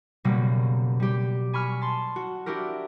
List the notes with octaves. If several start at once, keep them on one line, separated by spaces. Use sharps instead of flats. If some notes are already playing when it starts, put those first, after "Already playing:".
F#1 B2 G3 A#3 F#4
G3 G4
G#5 B5 C#6 F6
A5 C6
F#4
D4 E4 F#4 G4 A#4